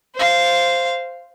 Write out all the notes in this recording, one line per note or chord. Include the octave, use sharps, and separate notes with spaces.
C5 F5